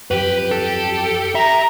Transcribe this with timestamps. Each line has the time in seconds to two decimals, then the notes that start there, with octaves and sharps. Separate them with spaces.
0.11 F#2 F3 G4 B4
0.51 A4
1.35 E5 A#5